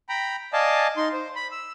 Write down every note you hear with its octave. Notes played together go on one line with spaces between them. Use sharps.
G5 A#5 B5
D5 D#5 F5 G#5 A5
D#4 C6
C5
B5
E6